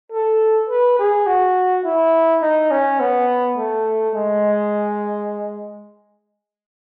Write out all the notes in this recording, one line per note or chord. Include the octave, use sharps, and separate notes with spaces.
A4
B4
G#4
F#4
E4
D#4
C#4
B3
A3
G#3